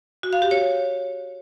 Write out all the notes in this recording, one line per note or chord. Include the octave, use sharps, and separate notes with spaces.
F#4
F5
G4
C#5